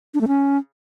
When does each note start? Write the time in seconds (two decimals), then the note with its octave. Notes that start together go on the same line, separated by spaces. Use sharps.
0.14 D4
0.21 A3
0.28 C#4